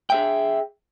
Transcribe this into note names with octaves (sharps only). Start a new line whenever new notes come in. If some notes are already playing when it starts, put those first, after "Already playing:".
G#4 E5 G5